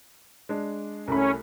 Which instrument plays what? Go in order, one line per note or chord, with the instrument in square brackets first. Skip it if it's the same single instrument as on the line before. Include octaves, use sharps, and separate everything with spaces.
[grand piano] G#3 D4
[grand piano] C2 A3 B5 [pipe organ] C#4